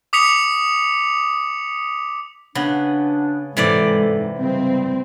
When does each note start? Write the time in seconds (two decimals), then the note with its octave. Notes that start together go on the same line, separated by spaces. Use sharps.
0.13 D6 D#6 B6 C#7 F7
2.55 C#3 B3 D4
3.57 G#2 C3 E3 A4 D5
4.38 C#3 G3 G#3 C4